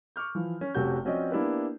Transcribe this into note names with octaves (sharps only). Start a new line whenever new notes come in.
C#6 D6 F6 G6
E3 F3
C#4
F1 C3 C#4 F#4 G6
F3 C4 C#4 F#4 D5 D#5
A#3 B3 D4 E4 G4 B4